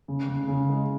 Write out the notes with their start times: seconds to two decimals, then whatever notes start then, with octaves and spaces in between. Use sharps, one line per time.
0.08 C#3
0.29 C#3
0.48 C#3
0.69 G#3